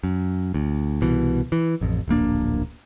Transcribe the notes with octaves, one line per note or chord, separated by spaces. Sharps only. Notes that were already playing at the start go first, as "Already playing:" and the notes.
F#2
D2
C2 B2 E3
E3
A1 F2
D1 A#1 A#3 D4